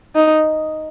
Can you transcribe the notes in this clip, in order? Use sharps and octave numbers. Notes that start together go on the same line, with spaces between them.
D#4